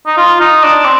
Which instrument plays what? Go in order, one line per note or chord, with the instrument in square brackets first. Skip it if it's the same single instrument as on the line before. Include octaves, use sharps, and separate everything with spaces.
[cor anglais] D#4
F4
D#4
D4
C4